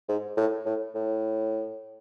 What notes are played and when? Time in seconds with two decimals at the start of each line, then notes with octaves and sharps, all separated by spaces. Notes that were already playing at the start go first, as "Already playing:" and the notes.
0.08 G#2
0.37 A2
0.65 A2
0.95 A2